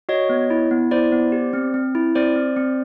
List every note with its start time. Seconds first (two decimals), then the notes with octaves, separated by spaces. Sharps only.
0.09 F#4 C#5 D#5
0.29 B3
0.50 E4
0.71 B3
0.91 E4 C5 D5
1.12 B3
1.32 G4
1.53 C4
1.74 C4
1.95 E4
2.15 C4 C5 D5
2.36 C4
2.57 C4